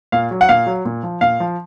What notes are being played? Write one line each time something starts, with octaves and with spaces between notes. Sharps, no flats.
A#2 F5
F#3
F#5
A#2 F5
F#3
A#2
F3
A#2 F5
F3